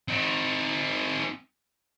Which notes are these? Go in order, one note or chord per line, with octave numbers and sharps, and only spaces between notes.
C4 D#4